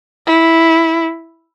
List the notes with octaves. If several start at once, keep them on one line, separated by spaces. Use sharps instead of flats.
E4